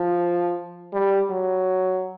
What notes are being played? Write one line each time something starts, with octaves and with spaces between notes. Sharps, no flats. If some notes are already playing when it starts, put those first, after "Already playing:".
Already playing: F3
G3
F#3